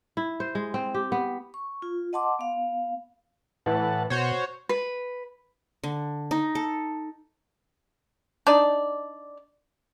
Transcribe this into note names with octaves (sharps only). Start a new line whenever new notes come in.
E4
C5
G#3
C4
G4
B3
C#6
F4
D#5 F#5 A5 C6 D6
B3 F5
A2 E3 B4 F#5 A5
B2 F#4 C5 C#5
B4
D3
D#4
A4
D4 D#4 D5